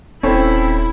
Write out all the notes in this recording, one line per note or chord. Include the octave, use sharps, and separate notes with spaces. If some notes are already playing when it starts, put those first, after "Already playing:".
D#1 C4 C#4 E4 A4